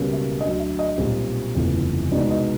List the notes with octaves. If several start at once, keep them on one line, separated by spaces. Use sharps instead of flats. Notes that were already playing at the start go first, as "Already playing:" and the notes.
Already playing: C#2 B2 G3 A#3 C#4
E5
D2 D3 F#3 D#5
E5
D#5
B1 A#2 G3 C4
F#1 E2 C3 F3 A3
C2 B2 G#3 B3 D#4 D5
D#5